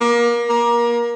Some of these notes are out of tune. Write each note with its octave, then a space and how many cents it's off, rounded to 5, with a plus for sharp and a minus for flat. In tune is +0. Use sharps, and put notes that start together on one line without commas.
A#3 +30
A#3 +25